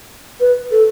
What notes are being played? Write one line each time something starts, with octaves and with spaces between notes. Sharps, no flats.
B4
A4